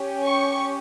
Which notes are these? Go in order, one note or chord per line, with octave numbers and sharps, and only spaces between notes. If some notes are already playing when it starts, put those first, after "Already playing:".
Already playing: C#4 G4
C#6